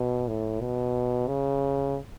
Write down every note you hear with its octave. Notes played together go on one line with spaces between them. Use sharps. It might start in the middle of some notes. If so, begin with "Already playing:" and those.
Already playing: B2
A2
B2
C#3